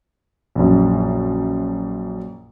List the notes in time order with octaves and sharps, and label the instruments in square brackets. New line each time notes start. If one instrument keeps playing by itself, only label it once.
[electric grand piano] A#1 F#2